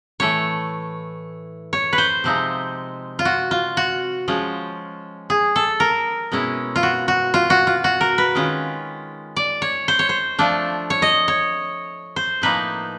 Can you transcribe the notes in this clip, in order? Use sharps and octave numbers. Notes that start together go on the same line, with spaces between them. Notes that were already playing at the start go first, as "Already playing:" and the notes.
A2 E3 A3 C#5
C#5
B4
C5
C3 F3 G#3 C4 D#4
F4
F#4
F4
F#4
F3 G#3 C#4 F4
G#4
A4
A#4
B2 G#3 C#4 E4
F4
F#4
F#4
F4
F#4
F4
F#4
A#4
B4
D#3 G#3 C#4 F4
D5
C#5
C5
C#5
C5
F3 A3 D4 F4
C#5
D#5
C#5
C5
A2 F3 A#3 D#4 B4